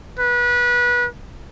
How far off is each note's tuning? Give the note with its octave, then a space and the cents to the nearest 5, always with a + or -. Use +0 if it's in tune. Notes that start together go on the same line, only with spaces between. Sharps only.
B4 -25